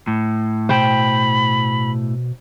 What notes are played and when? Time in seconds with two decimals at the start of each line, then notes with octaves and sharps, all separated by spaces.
0.07 A2
0.69 B2 C5 G5 B5